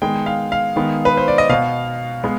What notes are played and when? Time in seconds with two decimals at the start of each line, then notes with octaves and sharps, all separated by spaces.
0.02 D#3 G#3 B3 G5
0.26 F5
0.52 F5
0.76 D#3 G#3 B3
1.05 B4
1.17 C5
1.28 D5
1.38 D#5
1.49 B2 B3 F5
2.24 G#3 B3